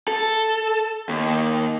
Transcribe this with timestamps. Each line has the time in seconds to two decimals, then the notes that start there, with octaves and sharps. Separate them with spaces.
0.08 A4
1.09 D#2